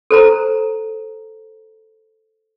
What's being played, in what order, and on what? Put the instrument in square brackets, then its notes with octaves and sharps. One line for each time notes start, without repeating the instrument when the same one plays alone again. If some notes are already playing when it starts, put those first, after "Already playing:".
[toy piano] A4 C5 A#5